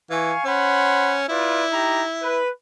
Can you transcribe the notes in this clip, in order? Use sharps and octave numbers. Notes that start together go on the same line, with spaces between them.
E3 F5 G#5 C#6
C#4 C5 F#5 B5
E4 F4 B4 D5
D#4 G4 A#5
B4